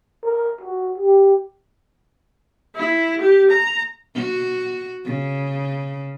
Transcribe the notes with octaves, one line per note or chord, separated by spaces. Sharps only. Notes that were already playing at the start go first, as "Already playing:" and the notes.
A#4
F#4
G4
E4
G4
A#5
F#4
C#3